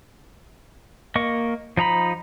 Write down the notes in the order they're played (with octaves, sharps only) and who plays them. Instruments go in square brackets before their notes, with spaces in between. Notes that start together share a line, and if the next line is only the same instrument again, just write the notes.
[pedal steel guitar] A#3 D#5 C#6
F3 D#4 A#5 B5